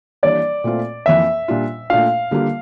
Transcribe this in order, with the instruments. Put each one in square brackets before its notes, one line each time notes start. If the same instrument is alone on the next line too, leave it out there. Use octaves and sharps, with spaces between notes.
[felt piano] E3 G3 A#3 D4 [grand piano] D5
[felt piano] A#2 A3 C4 F4
[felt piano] F2 E3 A#3 [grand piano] E5
[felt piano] A#2 G3 D4 F4
[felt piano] A#2 A3 D4 F4 [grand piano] F5
[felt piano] D3 G3 A#3 F4